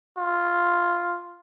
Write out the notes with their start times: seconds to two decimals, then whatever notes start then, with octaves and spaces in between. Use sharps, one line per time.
0.18 F4